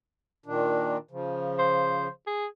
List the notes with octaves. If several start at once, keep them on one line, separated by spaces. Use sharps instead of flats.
A#2 D#3 D4
C#3 F3
C5
G#4